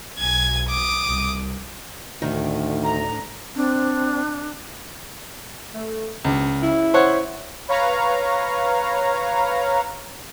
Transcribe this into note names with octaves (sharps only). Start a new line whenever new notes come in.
B1 G#5 G#6
D6 D#6
C2
D2 A2 D#3 D4
A#5
C4 D4
A3
C#2 B2 C4 D4
C#3 F#3 E4
C5 C#5 F#5
B4 C#5 F5 A#5